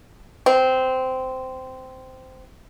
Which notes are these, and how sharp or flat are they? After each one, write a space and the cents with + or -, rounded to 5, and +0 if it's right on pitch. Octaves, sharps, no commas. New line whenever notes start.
C4 -15